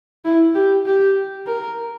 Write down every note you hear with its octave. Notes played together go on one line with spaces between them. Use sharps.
E4
G4
G4
A#4